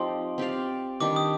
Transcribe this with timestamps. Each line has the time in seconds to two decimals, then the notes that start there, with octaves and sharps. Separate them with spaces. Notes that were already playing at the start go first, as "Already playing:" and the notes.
Already playing: F3 C4 D#4 G4 C6
0.38 C4 G4 D5 F5
1.00 D#3 G3 D4 G4 D6
1.16 D#6